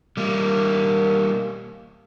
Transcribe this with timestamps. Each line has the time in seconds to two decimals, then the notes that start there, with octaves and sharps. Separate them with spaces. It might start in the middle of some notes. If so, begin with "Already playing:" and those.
0.17 G3 A#3